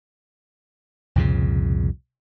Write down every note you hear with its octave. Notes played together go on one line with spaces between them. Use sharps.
C2 F2 A#2 C#3